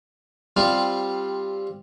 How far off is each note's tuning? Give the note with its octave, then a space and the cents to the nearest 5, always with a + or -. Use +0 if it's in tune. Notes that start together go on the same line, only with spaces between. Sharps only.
G3 +0 C4 +10 F4 +0